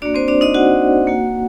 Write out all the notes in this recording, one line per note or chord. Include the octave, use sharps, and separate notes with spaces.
A#3 D4 F#4 D5
C4 C5
D4 D5
D#4 D#5
F#4 F#5
A#3 F#4